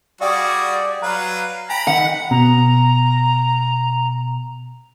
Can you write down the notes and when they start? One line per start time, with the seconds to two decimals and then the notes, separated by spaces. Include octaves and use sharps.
0.21 G3 F#4 G#4 D5 F5 G5
1.02 F#3 B4 F5 A#5
1.70 G5 G#5 A#5 B5 D7
1.88 D#3 F#5
2.31 B2 A#5